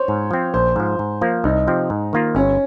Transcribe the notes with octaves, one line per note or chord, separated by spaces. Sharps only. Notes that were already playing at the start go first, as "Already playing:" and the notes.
Already playing: C5 C#5
G#2
F3 C4
A#1 C5
G#2 F3
G#2
F3 A#3
C2 D#4
C3 F3 C4
G#2
D#3 A#3 F4
G1 C#4